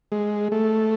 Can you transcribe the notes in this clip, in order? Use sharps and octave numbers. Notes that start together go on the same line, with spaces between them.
G#3
A3